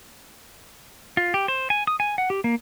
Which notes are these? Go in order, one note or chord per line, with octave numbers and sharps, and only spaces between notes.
F4
G4
C5
G#5
D#6
G#5
F#5
G4
A#3